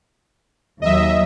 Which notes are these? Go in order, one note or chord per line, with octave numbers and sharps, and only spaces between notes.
D#2 F#3 D#5 E5